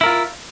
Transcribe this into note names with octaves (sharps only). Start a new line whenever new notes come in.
E4 F4 A#4